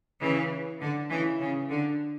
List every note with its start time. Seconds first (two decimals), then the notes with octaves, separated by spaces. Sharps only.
0.20 C#3 E3
0.80 D3
1.10 C#3 E3
1.40 C#3
1.70 D3